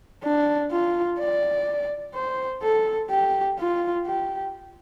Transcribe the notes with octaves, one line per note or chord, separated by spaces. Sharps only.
D4
F4
D5
C5
A4
G4
F4
G4